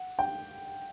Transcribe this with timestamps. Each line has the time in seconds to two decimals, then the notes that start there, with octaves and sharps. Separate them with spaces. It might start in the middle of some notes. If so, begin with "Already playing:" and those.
Already playing: F#5
0.19 G5